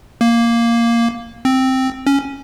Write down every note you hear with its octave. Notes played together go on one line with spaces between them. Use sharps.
A#3
C4
C#4